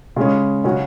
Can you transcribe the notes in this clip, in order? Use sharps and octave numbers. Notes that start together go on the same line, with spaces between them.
C#3 G#3 C#4
C#3 F#3 C#4 F#4